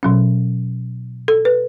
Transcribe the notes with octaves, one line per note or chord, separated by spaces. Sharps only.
B2 F#3 C#4
A4
B4